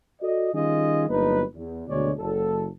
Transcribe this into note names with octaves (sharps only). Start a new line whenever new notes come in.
F#4 A4 D5 D#5
D#3 G3 C#4 F4 G#4 D#5
G1 F#3 A#3 D#4 B4
E2
D2 B2 D3 G#3 C#5 D5
F#1 A4